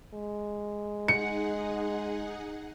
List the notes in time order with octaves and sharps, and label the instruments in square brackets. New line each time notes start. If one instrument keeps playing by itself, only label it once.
[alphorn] G#3
[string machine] D#4 G#4 F#5 [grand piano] C#7